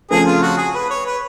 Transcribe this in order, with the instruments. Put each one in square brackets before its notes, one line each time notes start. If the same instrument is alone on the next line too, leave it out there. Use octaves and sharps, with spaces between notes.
[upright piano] F2 C#3 F3 A3 [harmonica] G#4
[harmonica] F4
F#4
G#4
B4
C#5
B4